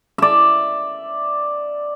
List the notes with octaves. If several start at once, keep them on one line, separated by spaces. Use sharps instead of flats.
D5 E5